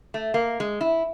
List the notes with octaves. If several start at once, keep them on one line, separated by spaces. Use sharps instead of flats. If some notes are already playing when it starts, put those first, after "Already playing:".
A3
A#3
G#3
E4